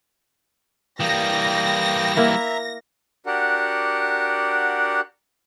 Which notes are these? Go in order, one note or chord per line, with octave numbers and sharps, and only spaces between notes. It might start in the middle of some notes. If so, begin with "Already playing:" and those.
E3 G3 A#3 G5 D#6 A#6
A#3 E4 E5 A#5
D4 F#4 G4 A#4 F#5